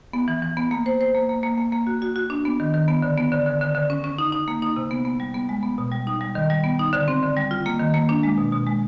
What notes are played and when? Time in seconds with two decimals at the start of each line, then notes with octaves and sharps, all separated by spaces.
0.13 B3
0.28 E3
0.42 E3
0.57 B3
0.71 A#3
0.86 C5
1.01 C5
1.15 A#3
1.29 A#3
1.43 A#3
1.58 A#3
1.72 A#3
1.87 F#4
2.02 F#4
2.16 F#4
2.30 D4
2.45 B3
2.60 D#3
2.74 D#3
2.88 B3
3.02 D3
3.18 B3
3.32 D3
3.46 D3
3.61 D3
3.75 D3
3.90 C#4
4.04 C#4
4.18 D#4
4.32 D#4
4.48 A#3
4.62 D#4
4.76 C3
4.91 B3
5.05 B3
5.20 G3
5.34 B3
5.49 G#3
5.63 B3
5.78 B2
5.92 G3
6.07 D#4
6.21 G3
6.35 D#3
6.50 G3
6.64 B3
6.79 D#4
6.93 D3
7.08 C4
7.23 D3
7.36 G3
7.51 F4
7.66 A#3
7.79 D#3
7.94 A#3
8.09 D4
8.23 G#3
8.38 B2
8.53 B2
8.67 G#3